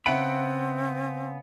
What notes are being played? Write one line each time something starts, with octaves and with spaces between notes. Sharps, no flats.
C#3 B3 C4 E5 F#5 B5 D7